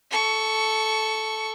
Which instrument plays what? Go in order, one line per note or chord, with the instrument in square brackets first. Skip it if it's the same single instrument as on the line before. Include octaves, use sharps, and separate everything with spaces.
[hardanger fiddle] A4 C#6